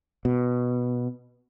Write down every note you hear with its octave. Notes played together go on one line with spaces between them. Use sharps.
B2